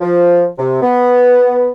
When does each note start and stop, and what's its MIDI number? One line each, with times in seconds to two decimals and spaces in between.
0.01 0.45 53
0.58 0.81 48
0.82 1.70 59